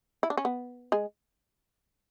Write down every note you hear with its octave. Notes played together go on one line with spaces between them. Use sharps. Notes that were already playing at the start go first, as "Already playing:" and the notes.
E4
D4
C#4
B3
G#3 G#4